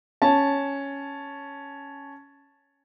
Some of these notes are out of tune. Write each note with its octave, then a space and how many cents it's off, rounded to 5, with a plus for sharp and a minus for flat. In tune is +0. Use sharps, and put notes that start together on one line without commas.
C#4 +0 A5 -5